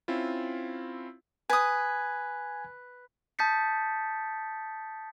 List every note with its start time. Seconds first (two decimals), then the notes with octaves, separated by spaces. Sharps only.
0.08 C4 C#4 E4 F4
1.50 B4 G#5 D#6 G#6
3.39 A5 D#6 G6 A6 B6 C#7